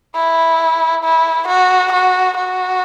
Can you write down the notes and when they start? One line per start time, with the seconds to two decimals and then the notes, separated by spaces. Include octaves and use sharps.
0.15 E4
1.04 E4
1.48 F#4
1.92 F#4
2.37 F#4